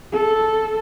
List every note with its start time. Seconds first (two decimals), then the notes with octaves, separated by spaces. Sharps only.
0.13 A4